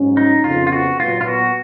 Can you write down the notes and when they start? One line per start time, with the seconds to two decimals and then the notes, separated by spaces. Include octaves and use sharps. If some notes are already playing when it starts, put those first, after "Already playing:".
Already playing: G#2 F#3 C#4
0.17 D#4
0.44 F2 C#3 F3 B3 F4
0.67 F4
0.72 F#4
1.00 A#2 F#3 B3 F4
1.21 F4
1.28 F#4